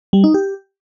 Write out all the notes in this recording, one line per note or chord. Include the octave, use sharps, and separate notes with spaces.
G3
D#4
G4